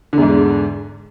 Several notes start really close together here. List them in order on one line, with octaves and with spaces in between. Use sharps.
D3 E2 G#2